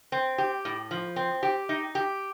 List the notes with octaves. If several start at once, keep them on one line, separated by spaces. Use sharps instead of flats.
C4
G4
A2
F3
C4
G4
D#4
G4